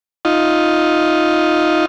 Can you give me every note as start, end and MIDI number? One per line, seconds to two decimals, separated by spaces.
0.25 1.86 63
0.25 1.86 65